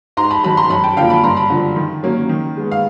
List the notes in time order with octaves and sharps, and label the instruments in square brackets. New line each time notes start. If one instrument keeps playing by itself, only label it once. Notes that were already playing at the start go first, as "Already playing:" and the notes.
[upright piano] G#2 A#5 C6
A5 B5
D#3 F#3 A5 B5
A#5 C6
F#2 A5 B5
G5 A5
D3 F3 A#3 F5 G5
A5 B5
G2 A#5 C6
A5 B5
D3 F3
D#3
F#3 A#3 C#4
D#3
G#3 B3
F5